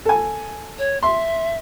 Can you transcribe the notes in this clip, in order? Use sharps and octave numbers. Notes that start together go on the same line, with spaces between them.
A4 G#5
C#5
E5 C6